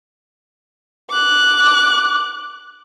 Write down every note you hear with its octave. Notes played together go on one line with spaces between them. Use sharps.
D6 F#6